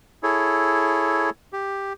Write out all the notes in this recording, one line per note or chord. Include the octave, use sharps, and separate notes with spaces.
E4 G#4 A4 C#5
G4